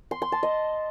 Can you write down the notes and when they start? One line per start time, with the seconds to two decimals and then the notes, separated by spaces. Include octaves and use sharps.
0.11 C6
0.22 C6
0.32 A5
0.43 D#5